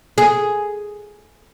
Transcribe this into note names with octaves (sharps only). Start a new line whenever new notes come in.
G#4